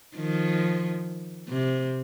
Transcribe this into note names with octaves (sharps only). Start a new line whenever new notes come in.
D#3 F3
C3